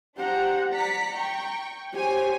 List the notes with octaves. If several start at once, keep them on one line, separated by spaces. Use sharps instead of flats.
D4 G4 C5 F#5 A#5
D5 A#5 B6 C#7
G5 C#6
G4 C5 C#5 G#5